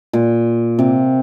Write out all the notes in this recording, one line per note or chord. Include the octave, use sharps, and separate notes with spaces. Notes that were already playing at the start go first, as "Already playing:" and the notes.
A#2
C3